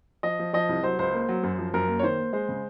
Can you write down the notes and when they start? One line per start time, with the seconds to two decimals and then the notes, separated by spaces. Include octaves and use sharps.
0.23 F3 D#5
0.39 F3
0.53 F3 D#5
0.69 C2
0.83 F#3 C5
0.99 C#2 C5
1.13 A#3
1.28 F#3
1.43 F#2
1.58 F3
1.74 F#2 A#4
1.88 A#3
1.99 C#5
2.03 D#3 C5
2.18 A#3
2.33 G#3 C5
2.49 C#3